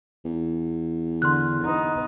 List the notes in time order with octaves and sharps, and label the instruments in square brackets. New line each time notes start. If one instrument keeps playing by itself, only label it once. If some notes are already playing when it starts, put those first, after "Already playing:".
[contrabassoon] E2
[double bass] D3 [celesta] C6 F6 F#6
[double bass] B3 D#4